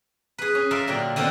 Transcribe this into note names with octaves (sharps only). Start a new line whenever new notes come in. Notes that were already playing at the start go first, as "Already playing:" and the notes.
G#4 B4
C#4
F4 A4 A#4 D5 E5 A5
A#2 D3 F#3 G5 A5
D3 D#3 B3 C4 D#4 A4